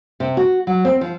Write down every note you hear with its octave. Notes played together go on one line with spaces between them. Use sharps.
C3
F#4
F#3
C4
F3